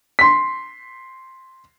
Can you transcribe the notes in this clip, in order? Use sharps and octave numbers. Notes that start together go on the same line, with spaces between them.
C6 B6